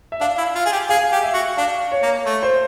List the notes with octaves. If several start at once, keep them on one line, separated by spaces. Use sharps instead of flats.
E5
D4 F5
E4
F4
G#4
G4
G#4 F5
G4
E5
F#4
D4 F5
C#5
A#3
A3
C5